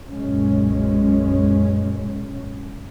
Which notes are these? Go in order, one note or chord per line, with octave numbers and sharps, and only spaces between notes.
B1 F#2 A#2 G#3 C#4